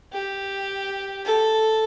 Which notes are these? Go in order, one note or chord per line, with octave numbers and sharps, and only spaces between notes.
G4
A4